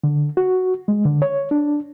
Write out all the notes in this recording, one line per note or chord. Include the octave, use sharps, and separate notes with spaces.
D3
F#4
G#3
D3
C#5
D4